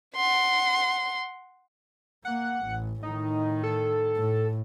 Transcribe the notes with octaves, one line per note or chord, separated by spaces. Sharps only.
F#5 C6
A#3 F#5
A1
A2 D#3 D#4
A4
A2